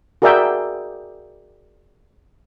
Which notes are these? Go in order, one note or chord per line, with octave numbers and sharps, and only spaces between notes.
F#4 G#4 A#4 D5 E5 G5